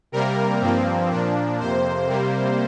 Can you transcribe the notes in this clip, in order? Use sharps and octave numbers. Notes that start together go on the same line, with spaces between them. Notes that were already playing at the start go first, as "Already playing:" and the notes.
C3 G3 A#3 A#4
G2 F3 A#3 C4
A#2 F3 A#3 D4
F2 C3 A#3 C5
C3 G3 A#3